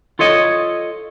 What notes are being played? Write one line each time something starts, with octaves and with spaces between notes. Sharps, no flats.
F4 A4 C#5 D#5